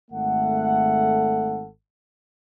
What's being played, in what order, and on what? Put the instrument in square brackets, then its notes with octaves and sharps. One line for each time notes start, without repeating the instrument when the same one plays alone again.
[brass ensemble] G#1 A3 A4 F#5